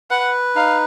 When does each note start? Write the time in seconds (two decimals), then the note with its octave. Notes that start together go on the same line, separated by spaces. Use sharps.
0.11 B4 F#5
0.55 D#4 F5